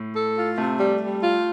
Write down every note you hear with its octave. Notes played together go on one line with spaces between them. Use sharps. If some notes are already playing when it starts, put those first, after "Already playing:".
Already playing: A2
A4
F4
C3 A3
G3
G3
F4